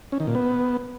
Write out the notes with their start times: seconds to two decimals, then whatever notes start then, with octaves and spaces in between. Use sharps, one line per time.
0.12 C#4
0.20 D#3
0.27 A#2
0.35 B3